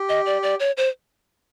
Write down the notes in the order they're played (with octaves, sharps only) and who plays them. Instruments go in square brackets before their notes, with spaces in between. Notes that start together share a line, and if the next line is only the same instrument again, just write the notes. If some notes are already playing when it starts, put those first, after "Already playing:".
Already playing: [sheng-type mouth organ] G4
[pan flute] D#5
D5
D5
C#5
C5